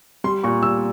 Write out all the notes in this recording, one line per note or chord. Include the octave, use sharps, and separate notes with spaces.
G3 C6
A#2 C#6
G3 E6